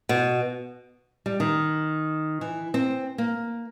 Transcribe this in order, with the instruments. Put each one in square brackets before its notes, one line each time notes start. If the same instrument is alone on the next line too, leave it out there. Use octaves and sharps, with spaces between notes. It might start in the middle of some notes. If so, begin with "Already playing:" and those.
[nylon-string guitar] B2
G3
D#3
E3
C4
A#3